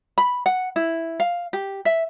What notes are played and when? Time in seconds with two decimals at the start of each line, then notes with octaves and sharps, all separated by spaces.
0.18 B5
0.46 F#5
0.76 E4
1.20 F5
1.53 G4
1.85 E5